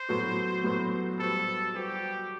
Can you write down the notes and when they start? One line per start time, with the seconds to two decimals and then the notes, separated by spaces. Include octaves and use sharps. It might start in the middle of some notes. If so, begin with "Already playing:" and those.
Already playing: C5
0.09 A2 F#3 B3 F#4 A4
0.64 A2 F#3 B3 F#4 A4
1.19 G3 C4 F#4 A4 B4
1.74 G3 C4 F#4 G4 B4